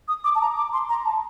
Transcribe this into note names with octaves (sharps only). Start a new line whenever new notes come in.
D#6
D6
A5
A#5
D6
C6
A#5
A5